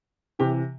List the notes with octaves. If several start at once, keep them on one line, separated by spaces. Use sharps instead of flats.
C3 E3 G4